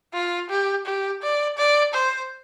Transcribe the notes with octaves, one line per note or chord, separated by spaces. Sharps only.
F4
G4
G4
D5
D5
C5